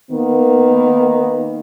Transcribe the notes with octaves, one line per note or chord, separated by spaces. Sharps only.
D#3 A#3 B3